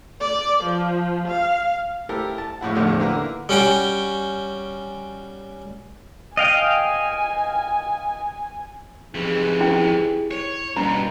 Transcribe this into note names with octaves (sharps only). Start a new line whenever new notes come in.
D5
F3
F5
E4 G4 A4 A#4
A5
A#1 A2 E4 F#5
A#1 E2 A2 D3 D#3 F3
D3 A#3 E4 A#4 B4
G3 C#4 F#4 G5
D#5 F5 G5 G#5
F2 E3 D#4 G4 G#4
E4 G5
C#5
G2 B2 A#3 A#5